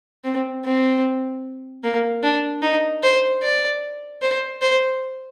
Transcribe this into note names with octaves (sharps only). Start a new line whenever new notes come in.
C4
C4
A#3
D4
D#4
C5
D5
C5
C5